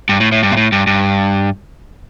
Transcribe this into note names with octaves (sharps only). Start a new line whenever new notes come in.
G2
A2
A2
G2
A#2
A2
G2
G2